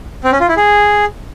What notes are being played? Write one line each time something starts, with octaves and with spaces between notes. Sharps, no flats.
C4
C#4
F4
E4
G#4